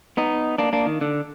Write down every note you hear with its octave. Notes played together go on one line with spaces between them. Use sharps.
B3 D#4
A#3 D4
A#3 D4
D#3
D3